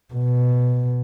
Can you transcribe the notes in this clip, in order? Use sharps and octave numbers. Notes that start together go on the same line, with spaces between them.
B2